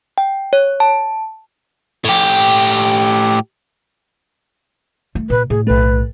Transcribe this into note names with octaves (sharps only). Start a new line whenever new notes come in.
G5
C#5
A5
A2 G4
A3
A#2 B4
A2 G#4
B1 A3 B4